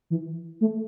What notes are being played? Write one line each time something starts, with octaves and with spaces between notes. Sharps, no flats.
E3
A3